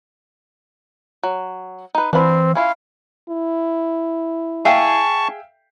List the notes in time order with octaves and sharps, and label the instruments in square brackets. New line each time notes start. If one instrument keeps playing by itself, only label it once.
[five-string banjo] F#3
D#4 B4
[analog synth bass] E3 [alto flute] C4 [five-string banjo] D4 F5 B5
[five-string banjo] C#4 E4 F4 [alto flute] F5
[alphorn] E4
[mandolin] G#4 [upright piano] E5 F5 G5 [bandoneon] A5 C#6